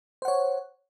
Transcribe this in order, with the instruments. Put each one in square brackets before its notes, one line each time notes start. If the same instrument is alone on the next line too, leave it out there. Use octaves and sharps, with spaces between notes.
[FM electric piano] C5
F#5
C#5